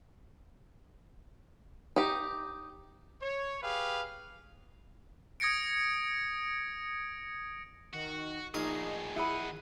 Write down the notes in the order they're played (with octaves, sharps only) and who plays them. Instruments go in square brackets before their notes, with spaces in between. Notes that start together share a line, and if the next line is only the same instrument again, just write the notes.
[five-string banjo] D#4 G4
[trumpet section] C#5
G4 G#4 B4 F5
[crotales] D#6 G#6 A#6 C#7 D7
[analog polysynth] D#3 [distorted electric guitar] F#4
[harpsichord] A#1 D#5 F5 [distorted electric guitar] A2 G#4 [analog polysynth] D#4
[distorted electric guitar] D#3 F#5 [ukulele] E4 G#4 B5 [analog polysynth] D#7